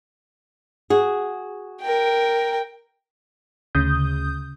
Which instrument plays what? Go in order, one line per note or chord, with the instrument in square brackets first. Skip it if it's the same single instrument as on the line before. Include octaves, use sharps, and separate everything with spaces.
[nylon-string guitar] F#4 G#4
[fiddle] A#4 G5
[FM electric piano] D2 C#3 D#6 G6